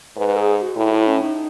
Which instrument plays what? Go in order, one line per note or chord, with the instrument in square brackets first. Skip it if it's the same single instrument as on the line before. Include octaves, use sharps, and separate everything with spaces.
[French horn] G#2 [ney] B4
[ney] G#4
G#4
F#4
[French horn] A2 [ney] E4
[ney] E4
C#4
D#4